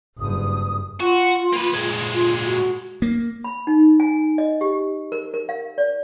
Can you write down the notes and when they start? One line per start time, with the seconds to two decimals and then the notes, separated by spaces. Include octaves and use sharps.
0.18 F#1 G2 D#6
1.00 F4 F#4
1.53 A#3 B4
1.74 A#2 G#3
2.14 F4
2.46 F#4
3.02 A#3
3.44 B5
3.67 D#4
4.00 G#5
4.38 D#5
4.61 G4
5.12 A#4
5.34 A#4
5.49 F5
5.78 D5